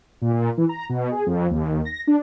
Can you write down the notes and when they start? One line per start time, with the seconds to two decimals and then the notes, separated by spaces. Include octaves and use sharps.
0.22 A#2
0.33 A#2
0.58 E3
0.69 A#5
0.89 B2
1.12 G#4
1.26 F2
1.51 D#2
1.85 A#6
2.07 D4